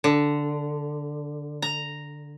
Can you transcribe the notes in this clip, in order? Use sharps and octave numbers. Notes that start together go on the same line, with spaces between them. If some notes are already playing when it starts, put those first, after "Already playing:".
D3
A#5